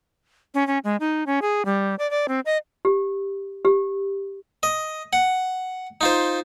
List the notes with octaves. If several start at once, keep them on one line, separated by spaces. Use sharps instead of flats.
C#4
C#4
G#3
D#4
C#4
G#4
G3
D5
D5
C4
D#5
G4
G4
D#5
F#5
D#4 F4 C5